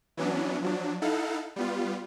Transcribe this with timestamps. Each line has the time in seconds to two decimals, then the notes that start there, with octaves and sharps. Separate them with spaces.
0.17 E3 F#3 B3 C#4 D4
0.62 F3 F#3 D4
1.02 D#4 E4 A4 F5 F#5
1.56 G3 B3 F4